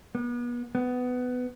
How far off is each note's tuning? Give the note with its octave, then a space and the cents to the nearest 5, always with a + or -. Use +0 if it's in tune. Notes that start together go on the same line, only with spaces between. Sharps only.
B3 -35
B3 +15